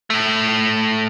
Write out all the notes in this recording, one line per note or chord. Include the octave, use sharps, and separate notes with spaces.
A2 A3